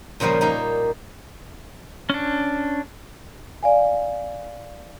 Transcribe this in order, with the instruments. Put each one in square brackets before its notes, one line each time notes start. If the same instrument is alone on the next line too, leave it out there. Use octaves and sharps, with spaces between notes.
[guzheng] A#2 C#3 F3 G3 A#3
A#3 D#4 G4
[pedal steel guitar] C#4 D4
[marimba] D5 F5 G#5